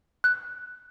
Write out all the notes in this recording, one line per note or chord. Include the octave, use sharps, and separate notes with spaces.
F#6